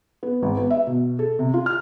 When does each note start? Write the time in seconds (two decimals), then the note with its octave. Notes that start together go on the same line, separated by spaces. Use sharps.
0.23 B3
0.42 G#1
0.57 B3
0.70 E5
0.87 B2
1.19 A4
1.39 C3
1.54 F4
1.66 F6